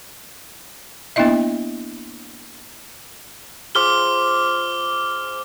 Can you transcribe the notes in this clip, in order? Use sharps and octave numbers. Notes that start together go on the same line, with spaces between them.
A#3 B3 D4 E4 D#5 E5
F4 G#4 C5 D6 F6 G7